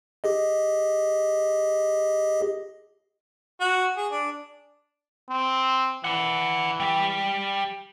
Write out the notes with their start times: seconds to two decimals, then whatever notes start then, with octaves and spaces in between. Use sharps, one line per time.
0.24 G4 G#4 D#5
3.61 F#4
3.97 G#4
4.12 D4
5.30 C4
6.04 E3 D5 F#5
6.80 G3 G4